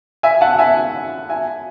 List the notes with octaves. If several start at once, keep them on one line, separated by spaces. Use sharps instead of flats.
E5 G#5
F#5 A5
E5 G#5
E5 G#5